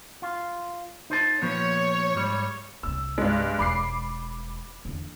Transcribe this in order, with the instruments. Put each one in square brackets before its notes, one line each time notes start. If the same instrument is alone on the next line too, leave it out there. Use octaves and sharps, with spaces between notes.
[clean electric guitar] F4
D#4 C5 A5
[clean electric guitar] A#2 F3 B3 [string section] C#5
[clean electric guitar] G#2 G3
[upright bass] C2 B3 [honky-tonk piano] E6
[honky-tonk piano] G2 G#3
[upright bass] E1 [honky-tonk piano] B5 D6 C7
[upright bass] E2 D3